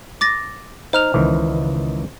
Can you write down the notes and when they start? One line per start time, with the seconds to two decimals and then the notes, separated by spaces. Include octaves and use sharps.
0.21 D6 A6 A#6
0.93 D#4 C5 F6 F7
1.14 C#2 D#3 E3